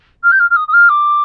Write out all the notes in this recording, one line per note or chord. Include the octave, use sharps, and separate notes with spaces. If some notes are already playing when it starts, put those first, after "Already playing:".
F6
G6
F6
F6
D#6
D#6
F6
D6